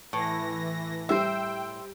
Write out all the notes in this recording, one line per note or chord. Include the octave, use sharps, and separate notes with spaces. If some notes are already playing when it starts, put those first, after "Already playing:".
A2 E3 A#6
G3 C5 E5 G5 E6